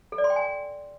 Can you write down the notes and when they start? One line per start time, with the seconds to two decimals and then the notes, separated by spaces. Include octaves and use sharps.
0.12 A4
0.18 D5
0.24 C6
0.30 G5
0.36 G#5